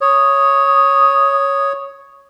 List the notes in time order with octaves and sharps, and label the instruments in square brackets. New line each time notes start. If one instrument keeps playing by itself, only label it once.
[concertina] C#5 [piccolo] D#6